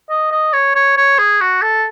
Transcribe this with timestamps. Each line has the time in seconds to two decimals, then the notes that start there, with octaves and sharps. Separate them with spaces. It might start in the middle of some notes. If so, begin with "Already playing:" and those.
0.10 D#5
0.31 D#5
0.53 C#5
0.75 C#5
0.97 C#5
1.19 G#4
1.41 F#4
1.62 A4